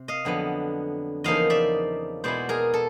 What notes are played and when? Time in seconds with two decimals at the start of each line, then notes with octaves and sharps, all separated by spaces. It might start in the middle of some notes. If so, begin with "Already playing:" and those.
Already playing: C3
0.08 D#5 F5
0.25 F2 D3 F#3 B3
1.24 E2 C#3 F3 A#3 D#4 D#5 F5
1.50 D5 E5
2.24 B2 G#3 B3 E4 C5 D5
2.49 G#4 A#4
2.74 A4